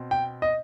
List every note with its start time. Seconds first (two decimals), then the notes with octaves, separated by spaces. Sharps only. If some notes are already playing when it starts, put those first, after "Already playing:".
Already playing: B2 C4
0.11 G5
0.42 D#5